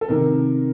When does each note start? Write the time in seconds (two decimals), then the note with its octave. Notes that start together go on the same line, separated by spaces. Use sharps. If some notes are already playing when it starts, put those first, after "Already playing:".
0.01 A4
0.08 C3 D#3 A#4